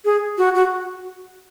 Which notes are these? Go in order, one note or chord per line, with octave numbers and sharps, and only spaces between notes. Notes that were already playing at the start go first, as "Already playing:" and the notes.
G#4
F#4
F#4